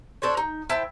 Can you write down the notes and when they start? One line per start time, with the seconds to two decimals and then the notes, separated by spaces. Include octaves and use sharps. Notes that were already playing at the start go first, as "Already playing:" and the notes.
0.22 D4 A4 C5 C#5
0.37 D#4
0.70 E4 C5 G5 A5